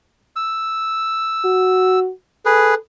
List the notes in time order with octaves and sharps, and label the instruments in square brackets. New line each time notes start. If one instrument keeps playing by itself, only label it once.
[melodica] E6
[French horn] F#4
[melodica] G#4 B4 [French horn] A4